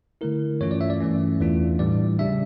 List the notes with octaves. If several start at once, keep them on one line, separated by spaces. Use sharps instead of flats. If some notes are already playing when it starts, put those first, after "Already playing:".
D3 A3 E4 A#4
G2 E3 A3 C#4 F4 C#5
D5
E5
D5
G2 E3 A3 C#4
E2 E3 A3 D4 F4
A2 E3 G3 D5
C#3 G3 D4 E5